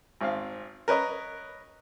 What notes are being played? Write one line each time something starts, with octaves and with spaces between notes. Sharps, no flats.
G#1 C4 F5
A#4 B4 C#5 D#5